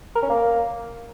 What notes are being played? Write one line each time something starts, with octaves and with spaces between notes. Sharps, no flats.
A#4
C#4
A#3